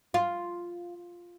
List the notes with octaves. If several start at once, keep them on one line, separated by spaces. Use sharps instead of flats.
F4